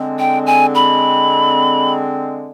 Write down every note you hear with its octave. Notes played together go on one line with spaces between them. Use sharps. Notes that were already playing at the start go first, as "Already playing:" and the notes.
Already playing: D3 G#3 C4
G5
G#5
B5